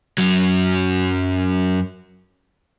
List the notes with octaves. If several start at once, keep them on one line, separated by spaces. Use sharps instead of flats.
F#2 F#3